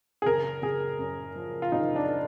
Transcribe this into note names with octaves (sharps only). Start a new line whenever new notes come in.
G#4
F#1 A#4
F#1 G#4
F#2
F3
F4
F#1 D#4
D4